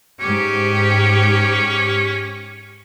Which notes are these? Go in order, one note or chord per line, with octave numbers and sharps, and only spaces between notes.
G#2 C#4 G4